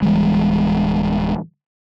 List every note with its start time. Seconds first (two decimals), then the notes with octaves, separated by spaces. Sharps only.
0.02 D1 E3 G3 G#3